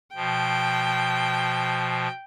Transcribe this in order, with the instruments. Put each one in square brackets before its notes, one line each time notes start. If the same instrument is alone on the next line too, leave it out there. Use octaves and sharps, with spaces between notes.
[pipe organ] B2 F3 [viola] G5